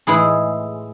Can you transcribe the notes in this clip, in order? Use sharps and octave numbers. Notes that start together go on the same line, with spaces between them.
A2 E3 G#3 E4 G#4